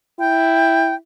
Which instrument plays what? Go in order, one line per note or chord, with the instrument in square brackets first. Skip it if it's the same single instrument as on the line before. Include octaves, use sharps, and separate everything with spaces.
[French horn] E4 [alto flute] G5